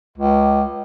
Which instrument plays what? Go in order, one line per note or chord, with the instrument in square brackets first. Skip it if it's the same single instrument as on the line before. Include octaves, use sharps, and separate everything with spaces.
[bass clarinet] C#2